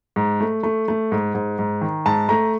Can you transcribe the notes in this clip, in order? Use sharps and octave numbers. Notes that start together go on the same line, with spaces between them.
G#2
A3
A3
A3
G#2
G#2
G#2
D#3
G#2 A5
A3 A#5